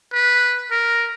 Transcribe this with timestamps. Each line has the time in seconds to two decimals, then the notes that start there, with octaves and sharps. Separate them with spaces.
0.13 B4
0.71 A#4